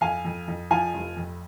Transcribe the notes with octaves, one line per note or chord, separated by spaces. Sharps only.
F2 F5 G#5
F2
F2
F3 F5 G#5
F1
F2